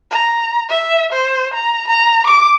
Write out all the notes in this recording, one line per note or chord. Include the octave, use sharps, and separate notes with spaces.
A#5
E5
C5
A#5
A#5
D6